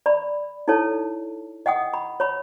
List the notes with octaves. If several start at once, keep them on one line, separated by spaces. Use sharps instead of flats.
D5 B5
D#4 E4 A4 C#5 A5
D#5 F#5 G5 D#6
B5
C#5 B5